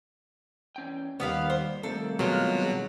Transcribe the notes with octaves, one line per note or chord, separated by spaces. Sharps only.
E2 C#4 G5
D#2 G3 A#3 B3 B4 F5
C5
C3 D#3 G3 A3 A#3 A4
B2 F#3 G#3 F4